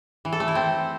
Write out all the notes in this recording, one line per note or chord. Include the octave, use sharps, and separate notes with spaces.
E3
A4
A3
E4
C4